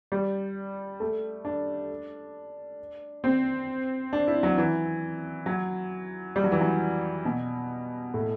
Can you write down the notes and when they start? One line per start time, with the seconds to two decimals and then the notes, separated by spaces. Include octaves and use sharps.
0.12 G3
1.00 A3
1.45 D4
3.24 C4
4.13 D4
4.27 E4
4.43 F#3
4.58 E3
5.46 F#3
6.36 G3
6.44 F#3
6.52 E3
6.61 F#3
7.25 B2
8.14 A2